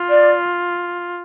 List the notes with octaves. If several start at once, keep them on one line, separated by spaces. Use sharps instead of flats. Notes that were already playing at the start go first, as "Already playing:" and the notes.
Already playing: F4
D5